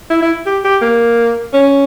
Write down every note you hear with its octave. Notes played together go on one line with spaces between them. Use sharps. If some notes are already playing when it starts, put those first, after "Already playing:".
E4
E4
G4
G4
A#3
C#4